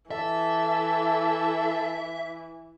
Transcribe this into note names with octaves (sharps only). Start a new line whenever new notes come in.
E3 A4 E5